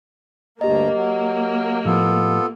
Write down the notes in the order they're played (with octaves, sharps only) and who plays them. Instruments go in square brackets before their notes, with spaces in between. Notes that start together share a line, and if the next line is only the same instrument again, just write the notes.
[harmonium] D2 G2 A#5 [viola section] A#3 [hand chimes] G4 D#5
[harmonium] F#3
[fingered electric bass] A2 F3 [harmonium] B3 F4 A4